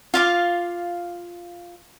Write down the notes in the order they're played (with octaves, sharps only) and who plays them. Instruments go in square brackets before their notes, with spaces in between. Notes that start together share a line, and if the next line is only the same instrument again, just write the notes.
[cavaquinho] F4 F5 D6